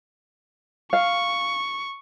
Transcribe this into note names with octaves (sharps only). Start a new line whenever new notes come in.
F5 C#6